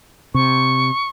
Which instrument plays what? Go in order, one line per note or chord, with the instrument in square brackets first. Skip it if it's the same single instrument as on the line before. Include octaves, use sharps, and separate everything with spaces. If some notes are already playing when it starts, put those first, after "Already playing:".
[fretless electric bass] C3 [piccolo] C#6